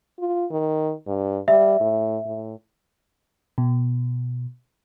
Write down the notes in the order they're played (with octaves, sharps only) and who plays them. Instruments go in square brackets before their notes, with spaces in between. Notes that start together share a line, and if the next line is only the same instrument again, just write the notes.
[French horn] F4
D#3
G2
[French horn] G3 [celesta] E5
[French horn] A2
A2
[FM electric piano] B2